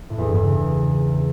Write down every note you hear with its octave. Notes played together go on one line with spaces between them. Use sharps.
A2
E2
G2
E2
C#3